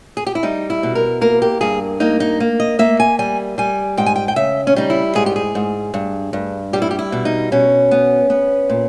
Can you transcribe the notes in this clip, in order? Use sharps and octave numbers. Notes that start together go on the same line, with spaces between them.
G#4
G4
E4
G3 D#4
E4
B2
A#4
A#3 A#4
G4
G2 G#4
A#3 D#4
D#4
A#3
D#5
A#3 E5
G#5
G3 G#5
G3 G#5
G#2 G5
G#5
G5
G5
C#3 E5
C#4
G3 D#4
E4
G#2 G#4
G4
G#4
G#2
G2
G2
G3 G4
E4
G4
E4
B2
D#4
B2 C#4
B3
B3
A#2